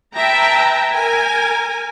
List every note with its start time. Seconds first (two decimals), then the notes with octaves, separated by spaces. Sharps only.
0.14 B4 E5 G5 A5 A#5
0.91 A#4 G#5